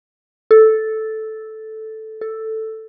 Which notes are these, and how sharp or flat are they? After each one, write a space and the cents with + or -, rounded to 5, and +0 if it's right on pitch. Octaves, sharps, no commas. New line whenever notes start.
A4 -5
A4 +5